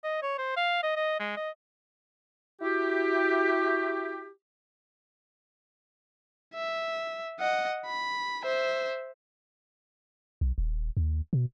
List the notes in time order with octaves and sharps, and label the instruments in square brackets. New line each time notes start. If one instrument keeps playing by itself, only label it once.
[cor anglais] D#5
C#5
C5
F5
D#5
D#5
G#3
D#5
[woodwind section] E4 F#4 G4
[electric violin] E5
D#5 F#5
B5
C5 E5
[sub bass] B1
D#1
D#2
B2